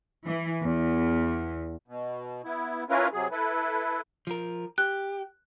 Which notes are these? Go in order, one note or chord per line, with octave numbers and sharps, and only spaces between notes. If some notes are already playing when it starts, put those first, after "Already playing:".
E3
E2
B2
B3 E4
C#4 E4 F4 A#4 B4
C3 F#3 G#4
E4 A4 B4
F3 A#4
G4 F#6